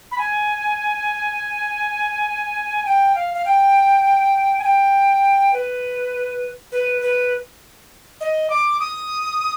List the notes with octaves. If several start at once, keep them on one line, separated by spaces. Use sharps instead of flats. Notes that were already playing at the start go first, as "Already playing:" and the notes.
B5
G#5
G5
F5
F5
G5
G#5
G5
B4
B4
B4
D#5
D6
D#6